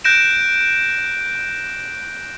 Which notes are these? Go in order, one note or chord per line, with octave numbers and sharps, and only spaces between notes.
F#6 G6 A#6 D7 E7